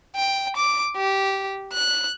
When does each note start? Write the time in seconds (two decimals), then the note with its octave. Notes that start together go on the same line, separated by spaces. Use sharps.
0.16 G5
0.57 D6
0.96 G4
1.73 F#6